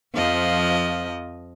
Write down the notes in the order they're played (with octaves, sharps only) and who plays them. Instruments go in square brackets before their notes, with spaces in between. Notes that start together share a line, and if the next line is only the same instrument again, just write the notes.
[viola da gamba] F2 F3 D#5